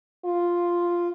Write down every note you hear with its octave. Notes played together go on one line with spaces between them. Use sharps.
F4